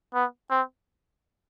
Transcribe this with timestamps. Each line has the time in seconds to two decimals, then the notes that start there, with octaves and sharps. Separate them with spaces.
0.14 B3
0.51 C4